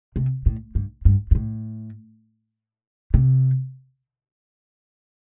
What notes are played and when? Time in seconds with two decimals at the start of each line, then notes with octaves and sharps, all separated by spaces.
0.16 C3
0.46 A2
0.75 G2
1.05 G2
1.31 G2
1.35 A2
3.14 C3